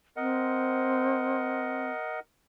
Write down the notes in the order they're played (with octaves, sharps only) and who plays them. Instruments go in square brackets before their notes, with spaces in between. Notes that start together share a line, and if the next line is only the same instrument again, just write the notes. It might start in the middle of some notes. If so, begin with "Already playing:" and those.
[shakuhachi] C4 [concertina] A#4 D#5 F#5